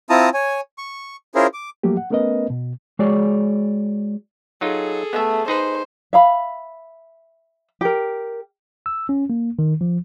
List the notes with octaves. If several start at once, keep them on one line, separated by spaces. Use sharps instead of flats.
C4 E4 F4 A5 A#5 D#6
C#5 G#5
C#6
C#4 E4 F4 G#4 A#4 C5
D6
F3 F#3 A3 A#3 G4
F#5
A3 B3 C#4 A#4 B4 D#5
B2
G#3 F#4 G#4 C#5 D5
F#3 D#4 F4 G#4 A4
A3 B3 E5
D#4 G#4 B4 C5
E5 F5 B5
G4 A#4
E6
C#4
A#3
D#3
F3